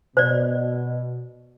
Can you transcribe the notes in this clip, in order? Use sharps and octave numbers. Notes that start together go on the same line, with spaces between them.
B2 C5 D5